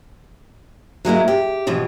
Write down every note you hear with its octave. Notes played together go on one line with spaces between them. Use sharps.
F#3 G#3 A#3 E4
G4
G#2 B2 E3 F3